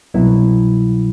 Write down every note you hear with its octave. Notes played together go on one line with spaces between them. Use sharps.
C2 B2 F#3 E4